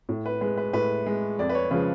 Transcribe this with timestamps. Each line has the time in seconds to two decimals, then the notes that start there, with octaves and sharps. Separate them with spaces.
0.09 A2
0.26 B4
0.41 G#3 B4
0.57 B4
0.73 A2 B4
1.06 G#3
1.39 F2 D5
1.49 B4
1.55 C#5
1.71 C#3 F3 G#3 B4